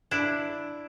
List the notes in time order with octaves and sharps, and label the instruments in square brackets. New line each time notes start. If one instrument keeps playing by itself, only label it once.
[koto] D4 E4